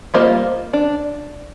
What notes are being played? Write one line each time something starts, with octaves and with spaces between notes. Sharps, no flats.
G3 A#3 F4 C5 D#5
D4